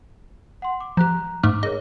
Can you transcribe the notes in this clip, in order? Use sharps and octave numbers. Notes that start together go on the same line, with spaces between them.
F#5 C6
D6
F3 G4 A#5 F#6
G#2 A3 D6 F6
G#4 A#4 C#5 D#5